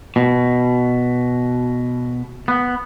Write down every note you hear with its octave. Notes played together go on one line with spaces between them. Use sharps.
B2
B3